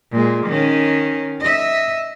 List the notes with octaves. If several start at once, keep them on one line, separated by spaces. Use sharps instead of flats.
A#2 G#3
D#3 C#4
D#5 E5